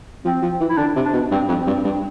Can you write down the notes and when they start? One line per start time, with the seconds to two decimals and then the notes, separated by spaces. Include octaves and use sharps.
0.24 F3 C4
0.43 F3
0.61 E3
0.69 E4
0.77 D3 D4
0.96 C3
1.05 D4
1.13 B2
1.32 G2 C4
1.49 F2
1.58 C4
1.67 G2
1.85 G2